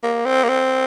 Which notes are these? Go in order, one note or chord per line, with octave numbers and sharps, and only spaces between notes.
A#3
C4
A#3
C4